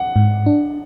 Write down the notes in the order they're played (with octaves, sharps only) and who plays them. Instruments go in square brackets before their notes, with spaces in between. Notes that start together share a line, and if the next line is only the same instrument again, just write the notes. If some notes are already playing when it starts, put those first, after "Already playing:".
Already playing: [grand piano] F#5
[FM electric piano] G#2
D4